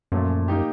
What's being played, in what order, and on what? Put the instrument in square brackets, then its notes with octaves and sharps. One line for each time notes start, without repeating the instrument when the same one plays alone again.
[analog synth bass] F#2 [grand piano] A#2 F3 A3
[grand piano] A#3 D#4 G4